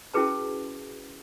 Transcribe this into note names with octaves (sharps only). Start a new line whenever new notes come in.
C#4 E4 F#4 G#4 B4 A5